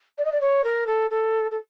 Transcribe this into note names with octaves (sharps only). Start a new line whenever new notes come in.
D5
D#5
D5
C#5
A#4
A4
A4
A4